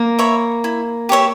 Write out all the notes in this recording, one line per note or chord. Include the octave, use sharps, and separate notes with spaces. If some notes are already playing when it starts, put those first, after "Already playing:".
Already playing: A#3
C#5 E5 B5
E4
G4 C#5 E5